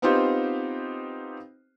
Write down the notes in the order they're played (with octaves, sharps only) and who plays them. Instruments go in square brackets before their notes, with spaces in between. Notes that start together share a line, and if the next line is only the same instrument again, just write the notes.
[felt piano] B3 C4 D#4 F4 G4 C5